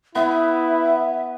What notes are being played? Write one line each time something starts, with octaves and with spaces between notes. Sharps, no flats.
B3 E4 E5